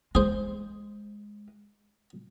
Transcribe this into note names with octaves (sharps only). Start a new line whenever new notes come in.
G#3 G#4 C5